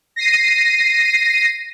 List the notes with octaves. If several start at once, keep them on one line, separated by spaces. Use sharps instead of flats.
A#6 C7 D#7